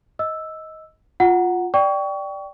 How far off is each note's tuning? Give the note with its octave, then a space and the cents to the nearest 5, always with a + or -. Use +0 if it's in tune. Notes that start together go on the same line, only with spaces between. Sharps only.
D#5 +20 E6 +0
F4 +10 F#5 +0 A#5 +0
D5 +0 G5 -5 C#6 +25